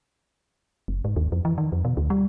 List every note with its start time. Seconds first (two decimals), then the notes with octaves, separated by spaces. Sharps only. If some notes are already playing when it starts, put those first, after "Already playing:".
0.88 F#1
1.05 G#2
1.16 D#2
1.32 F2
1.45 E3
1.58 D#3
1.72 F2
1.85 B2
1.97 D2
2.10 G3